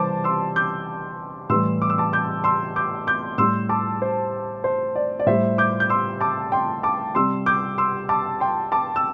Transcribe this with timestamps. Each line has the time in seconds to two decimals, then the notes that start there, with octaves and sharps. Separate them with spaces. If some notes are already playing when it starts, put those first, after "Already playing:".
Already playing: C3 E3 G3 C5 A5 D6
0.24 C6 E6
0.56 D6 G6
1.49 A2 E3 G3 C6 E6
1.82 D6
1.90 E6
1.98 A5 D6
2.13 D6 G6
2.44 C6 E6
2.76 D6 G6
3.07 D6 G6
3.38 A2 G3 C6 E6
3.69 A5 D6
4.02 C5
4.64 C5
4.96 D5
5.20 D5
5.26 A2 G3 C5 E5
5.58 D6 G6
5.80 G6
5.90 C6 E6
6.21 A5 D6
6.52 G5 C6
6.83 A5 D6
7.15 C3 G3 C6 E6
7.46 D6 G6
7.78 C6 E6
8.09 A5 D6
8.40 G5 C6
8.72 A5 D6
8.96 E6